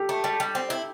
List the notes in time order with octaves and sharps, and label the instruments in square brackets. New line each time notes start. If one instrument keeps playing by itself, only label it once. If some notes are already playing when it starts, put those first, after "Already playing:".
Already playing: [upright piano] G4 A4
[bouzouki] A3
G3
G3
C4
E4